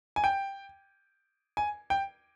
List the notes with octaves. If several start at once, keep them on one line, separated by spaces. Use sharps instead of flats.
G#5
G5
G#5
G5